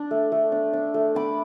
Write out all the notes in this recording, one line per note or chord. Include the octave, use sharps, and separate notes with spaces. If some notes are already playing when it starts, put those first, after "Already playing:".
Already playing: D4
A3
A3
D4
D4
A3
D4 B5 D6